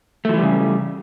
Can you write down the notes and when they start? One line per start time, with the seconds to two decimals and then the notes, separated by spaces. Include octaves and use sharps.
0.25 A3
0.29 F3
0.34 E3
0.38 G3
0.42 C#3